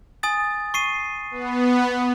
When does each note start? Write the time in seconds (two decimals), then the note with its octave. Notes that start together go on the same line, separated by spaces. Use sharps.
0.23 G#5 D#6 A6
0.74 C#6 C7 D#7
1.31 B3